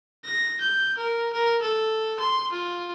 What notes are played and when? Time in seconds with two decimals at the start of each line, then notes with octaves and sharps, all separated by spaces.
0.25 A#6
0.61 G6
0.97 A#4
1.33 A#4
1.62 A4
2.20 C6
2.52 F4